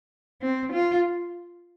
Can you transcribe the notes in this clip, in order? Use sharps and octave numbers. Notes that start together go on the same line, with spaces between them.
C4
F4